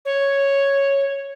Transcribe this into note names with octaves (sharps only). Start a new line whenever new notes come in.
C#5